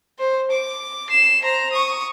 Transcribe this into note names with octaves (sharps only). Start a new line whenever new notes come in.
C5
D6
C7 E7
C5 A#5
C#6 D#6